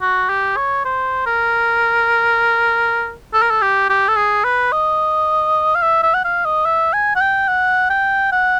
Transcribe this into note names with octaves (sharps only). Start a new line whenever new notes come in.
F#4
G4
C#5
C5
A#4
A4
A#4
A4
G4
G4
A4
G#4
B4
D#5
F5
E5
E5
F#5
F5
D#5
E5
G#5
F#5
G5
F#5
G5
F#5